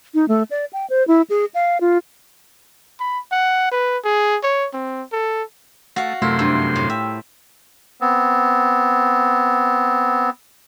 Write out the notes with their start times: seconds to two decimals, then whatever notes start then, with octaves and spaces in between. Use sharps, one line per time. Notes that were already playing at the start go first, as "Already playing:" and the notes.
0.14 D#4
0.28 A3
0.51 D5
0.73 G5
0.90 C5
1.08 E4
1.30 G#4
1.54 F5
1.81 F4
3.00 B5
3.32 F#5
3.72 B4
4.05 G#4
4.44 C#5
4.74 C4
5.13 A4
5.96 A3 F#4 F5
6.22 F#2 C3 A3 E4 F4 A4 A#4 C6
6.39 G2 C5
6.76 A2
6.90 E5 G5
8.00 B3 C4